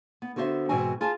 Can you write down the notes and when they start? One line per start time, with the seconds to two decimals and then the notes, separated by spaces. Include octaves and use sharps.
0.22 B3
0.36 D3 B3 F#4 C5 D#5 E5
0.69 G#2 B2 E3 C4 F#4 G#5
1.01 F4 G#4 G#5 A5